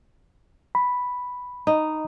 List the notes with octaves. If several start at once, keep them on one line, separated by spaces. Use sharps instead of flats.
B5
D#4